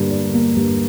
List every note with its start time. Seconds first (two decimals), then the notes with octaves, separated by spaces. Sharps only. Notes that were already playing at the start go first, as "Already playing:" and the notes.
Already playing: G2 D3 A#3
0.10 D4
0.34 A#3
0.56 G2